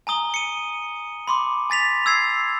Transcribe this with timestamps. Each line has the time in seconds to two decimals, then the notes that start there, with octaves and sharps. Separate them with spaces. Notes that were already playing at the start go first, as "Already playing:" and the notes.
0.07 G#5 A#5 D#6 G7
0.34 C#7 D#7
1.28 B5 C6 D6
1.70 G#5 A6 B6 F7
2.06 E6 G#6 C7